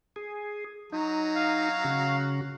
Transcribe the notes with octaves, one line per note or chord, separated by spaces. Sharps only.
G#4
F#3 D#4 A#5
F5
C#3 F#4